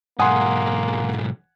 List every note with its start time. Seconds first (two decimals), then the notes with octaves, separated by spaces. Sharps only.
0.19 B1 G#2 A#3 F#5 G#5 C6 D#6